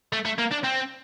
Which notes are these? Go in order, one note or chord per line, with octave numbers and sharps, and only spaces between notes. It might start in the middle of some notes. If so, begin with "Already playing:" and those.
A3
A3
A#3
D4
C4